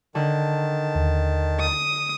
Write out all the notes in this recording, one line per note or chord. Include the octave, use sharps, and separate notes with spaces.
D3 D#3 A5
D#2
D#6